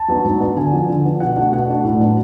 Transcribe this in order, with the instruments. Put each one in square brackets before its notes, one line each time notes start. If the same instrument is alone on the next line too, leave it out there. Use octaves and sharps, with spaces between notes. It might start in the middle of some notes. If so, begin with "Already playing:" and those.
Already playing: [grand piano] A5
F#3 B3 D4
G#2
F#3 B3 D4
D3 G#5
F3 B3 D4
D3
F3 B3 D4
B2 F#5
A3 D4 F#5
B2 F#5
A3 D4
A2
F#3 B3 D4